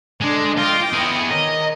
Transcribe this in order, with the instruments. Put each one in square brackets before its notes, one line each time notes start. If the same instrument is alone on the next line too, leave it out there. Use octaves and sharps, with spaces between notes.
[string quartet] D3 D4 [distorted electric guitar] G#3
[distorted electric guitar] F4 [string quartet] D#5 G5 D6
[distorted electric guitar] B3 G#4
[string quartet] D#3 A#4 C#5 [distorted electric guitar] D#5